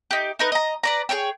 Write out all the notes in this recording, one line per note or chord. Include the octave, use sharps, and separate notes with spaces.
D#4 G4
D#4 A#4 B4
D#5 A#5
B4 D5 A#5
G#4 A#4 C#5 G5